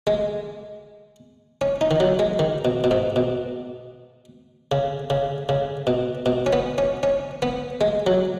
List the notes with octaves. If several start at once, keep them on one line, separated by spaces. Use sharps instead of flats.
G#3
C#4
D#4
D#3
F#3
G#3
D#3
B2
B2
G#2
B2
C#3
C#3
C#3
B2
B2
C#4
B3
C#4
C#4
B3
G#3
F#3